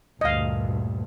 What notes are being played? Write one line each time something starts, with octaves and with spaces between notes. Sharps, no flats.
D2 G2 A#2 D#5 F5